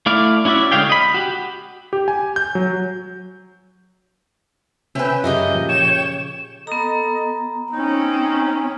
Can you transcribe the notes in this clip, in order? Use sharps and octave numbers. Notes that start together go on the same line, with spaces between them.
A3 E4 D5 F5
C#4 E4 F#4 D5 E5
D3 G#3 C#5 F5 G5
D#5 B5
F#4 G4
G4
G#5
G6
F#3
C3 C4 C#4 B4 E5 G5 G#5
F#2 C#3 G4 A#4 D#5 E5
A#2 F3
C#5 G5 E7
B3 A4 D#5 A#5
C4 C#4 D#4